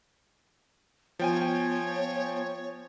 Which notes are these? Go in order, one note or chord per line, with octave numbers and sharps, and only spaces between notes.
F3 B3 C#5 G5 G#5